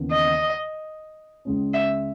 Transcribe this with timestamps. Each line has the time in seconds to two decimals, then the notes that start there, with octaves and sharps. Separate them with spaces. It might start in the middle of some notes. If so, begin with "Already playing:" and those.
Already playing: D#2 C#3 E3 B3
0.12 D#5
1.45 C#2 C#3 G#3 C#4
1.74 E5